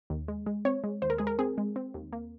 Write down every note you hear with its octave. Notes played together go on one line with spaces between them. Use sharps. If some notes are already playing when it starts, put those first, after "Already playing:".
D#2
G#3
G#3
C4 C#5
G#3
D#2 C5
A#4
G#3 G#4
A#4
C4 G#4
G#3
C4
D#2
A#3